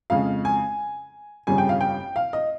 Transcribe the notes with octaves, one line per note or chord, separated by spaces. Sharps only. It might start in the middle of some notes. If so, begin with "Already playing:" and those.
F2 C#3 G#3 F5
G#5
G1 F2 C#3 G3 G#5
G5
F5
G5
F5
D#5